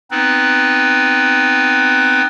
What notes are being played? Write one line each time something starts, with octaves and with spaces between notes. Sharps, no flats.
B3 C4 D#4 B4